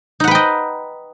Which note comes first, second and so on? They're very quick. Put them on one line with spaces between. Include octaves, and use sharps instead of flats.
D#4 F#5 B4 G5 D#5